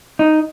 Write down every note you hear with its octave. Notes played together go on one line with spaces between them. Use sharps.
D#4